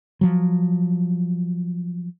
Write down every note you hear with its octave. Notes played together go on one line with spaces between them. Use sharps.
F3 F#3